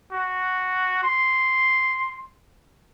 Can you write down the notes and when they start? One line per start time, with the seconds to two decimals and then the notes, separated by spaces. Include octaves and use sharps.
0.12 F#4
1.03 C6